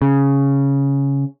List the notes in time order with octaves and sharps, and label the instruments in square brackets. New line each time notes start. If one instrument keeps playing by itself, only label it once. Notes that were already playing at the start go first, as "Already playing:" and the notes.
[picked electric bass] C#3